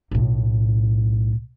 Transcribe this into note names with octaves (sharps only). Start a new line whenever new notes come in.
B1 A2